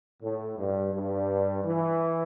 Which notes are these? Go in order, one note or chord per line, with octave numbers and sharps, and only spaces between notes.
A2
G2
G2
E3